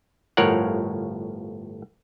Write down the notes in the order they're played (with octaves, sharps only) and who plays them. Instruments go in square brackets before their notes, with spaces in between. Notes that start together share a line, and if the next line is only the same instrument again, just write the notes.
[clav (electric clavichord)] G1 A2 F3 A#4 C#5 F#5